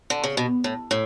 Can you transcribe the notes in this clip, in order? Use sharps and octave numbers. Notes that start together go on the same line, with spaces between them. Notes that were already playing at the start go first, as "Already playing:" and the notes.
D3
C#3
B2
A2
A2